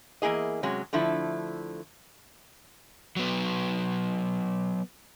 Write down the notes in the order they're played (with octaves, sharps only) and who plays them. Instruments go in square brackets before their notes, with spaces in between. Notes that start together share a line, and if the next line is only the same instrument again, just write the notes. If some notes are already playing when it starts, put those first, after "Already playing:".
[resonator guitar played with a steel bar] E2 A#3 E4 G#4 D#5
C3 F#3 G#3 C#4
D3 F3 A3 E4
[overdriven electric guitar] F#3 B3